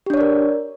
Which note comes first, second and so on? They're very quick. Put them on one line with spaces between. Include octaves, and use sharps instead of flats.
G4 D4 C#5 D5 A#4